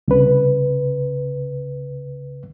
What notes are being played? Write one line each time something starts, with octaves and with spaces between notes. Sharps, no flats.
C2 C#3 B4